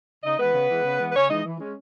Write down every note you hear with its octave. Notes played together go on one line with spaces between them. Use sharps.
C#3 D#4 D#5
E3 G#3 B3 B4
C#3
E3 G#3
C#3
E3 G#3
B4
C#3 C#4 C#5
E3 G#3 D#4 D#5
E3
G#3 C#4